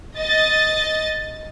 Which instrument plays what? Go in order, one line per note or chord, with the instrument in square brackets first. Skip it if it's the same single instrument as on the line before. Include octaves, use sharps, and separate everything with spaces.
[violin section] D#5 A6